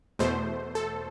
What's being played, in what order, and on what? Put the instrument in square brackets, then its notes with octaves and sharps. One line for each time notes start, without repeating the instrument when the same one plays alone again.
[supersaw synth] E2 B2 A3 C5
A4